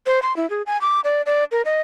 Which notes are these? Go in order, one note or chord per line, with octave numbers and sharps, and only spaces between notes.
C5
C6
E4
G#4
G#5
D6
D5
D5
A#4
D#5